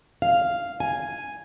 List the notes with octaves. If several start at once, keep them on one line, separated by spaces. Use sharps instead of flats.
F5
G#5